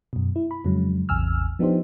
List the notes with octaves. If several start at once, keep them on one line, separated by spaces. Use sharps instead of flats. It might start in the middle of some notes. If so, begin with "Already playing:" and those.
F#2 B2
E4
B5
F2 C#3 F#3 G#3
A1 E2 C3 G#5 E6 F6
F3 B3 D4 D#4 G4 C5